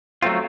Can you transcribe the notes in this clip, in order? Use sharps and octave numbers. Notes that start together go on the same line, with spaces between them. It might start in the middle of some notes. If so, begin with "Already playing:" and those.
F#3 A3 C4 F4